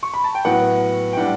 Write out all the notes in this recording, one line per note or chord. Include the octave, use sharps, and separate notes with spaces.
C#6
B5
A5
G5
A2 F#3 B3 F#5
G5
A2 G3 D4 F#5